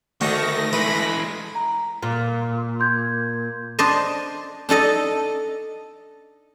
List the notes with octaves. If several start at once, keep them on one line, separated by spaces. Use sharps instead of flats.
D2 D#3 A3 F#4 C#6 A#6
E3 G#3 B4 B5
A#5
A#2
C6 G6 G#6
D4 C5 D5 D#5
D4 D#4 A4 D#5